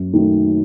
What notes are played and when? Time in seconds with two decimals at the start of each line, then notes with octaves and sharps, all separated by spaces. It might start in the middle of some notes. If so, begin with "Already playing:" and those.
Already playing: F#2
0.13 D#3 F#3 A3